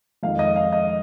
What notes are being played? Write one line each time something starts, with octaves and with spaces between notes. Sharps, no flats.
F2 D#3 G#3 F5
D#5
F5
D#5